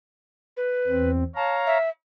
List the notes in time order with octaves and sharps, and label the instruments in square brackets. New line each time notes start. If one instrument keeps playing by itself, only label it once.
[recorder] B4
[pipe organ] E2 C4
[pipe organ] C#5 F5 A#5 [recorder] A5
[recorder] E5